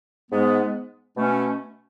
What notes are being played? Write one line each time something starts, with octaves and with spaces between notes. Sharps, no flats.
G#2 G#3 B3
B2 A3 C#4